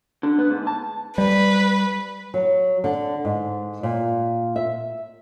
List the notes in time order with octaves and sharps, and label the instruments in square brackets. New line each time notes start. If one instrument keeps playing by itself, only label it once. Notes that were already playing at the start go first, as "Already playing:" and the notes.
[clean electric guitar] D3
B3
G#2
A5
[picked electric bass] G3 [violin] B4
[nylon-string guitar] F#3
D3
G#2
A#2
E5